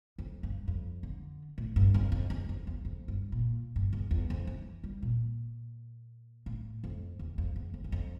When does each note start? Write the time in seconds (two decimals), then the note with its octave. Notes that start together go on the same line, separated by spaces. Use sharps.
0.18 F2
0.43 G2
0.68 F2
1.03 D3
1.58 A2
1.76 G2
1.94 F2
2.12 F2
2.30 E2
2.49 F2
2.67 E2
2.85 F2
3.08 G2
3.32 A#2
3.76 G2
3.93 E2
4.11 E2
4.30 F2
4.47 E3
4.84 G3
5.02 A#2
6.46 A2
6.84 F2
7.19 E2
7.38 F2
7.56 E2
7.74 F2
7.84 E2
7.92 F2